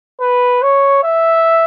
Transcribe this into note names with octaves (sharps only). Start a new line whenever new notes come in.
B4
C#5
E5